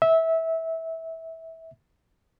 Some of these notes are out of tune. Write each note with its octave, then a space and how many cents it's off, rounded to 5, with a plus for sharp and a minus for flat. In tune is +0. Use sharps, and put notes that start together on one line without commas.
E5 -20